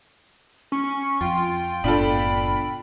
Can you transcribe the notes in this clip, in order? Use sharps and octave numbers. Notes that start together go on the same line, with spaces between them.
C#4 C#6
F2 F4 G5
F#1 A2 B3 D4 F4 A4 B5